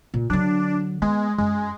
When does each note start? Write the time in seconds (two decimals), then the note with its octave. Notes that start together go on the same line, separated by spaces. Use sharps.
0.14 A#2
0.30 D3 F#3 D4
1.02 G#3 B3
1.38 F#2 G#3